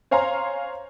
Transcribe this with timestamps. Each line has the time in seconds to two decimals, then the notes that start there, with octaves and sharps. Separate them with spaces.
0.11 C5 C#5 F5 G#5 A#5 C6